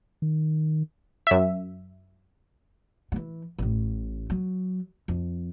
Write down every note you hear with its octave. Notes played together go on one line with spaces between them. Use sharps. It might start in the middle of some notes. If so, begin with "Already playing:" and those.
D#3
F#2 E5
E3 F#3
A1 A2
F#3
F2